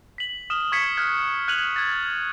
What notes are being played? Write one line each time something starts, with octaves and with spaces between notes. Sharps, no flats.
B6 F#7
D#6 F6 E7 G7
C#6 G#6 B6 C#7 G7
F6 F#6 G#6
F6 F#6 G#6 D#7 F7 F#7
G#6 A6